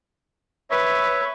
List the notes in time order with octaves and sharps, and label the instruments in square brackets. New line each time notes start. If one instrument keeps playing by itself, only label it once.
[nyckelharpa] B4 [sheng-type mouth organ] C#5 E5